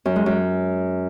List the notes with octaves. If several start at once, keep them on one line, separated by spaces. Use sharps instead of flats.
F#2
G#3
F#2